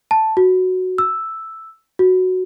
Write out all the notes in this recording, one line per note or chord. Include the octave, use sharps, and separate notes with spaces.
A5
F#4
E6
F#4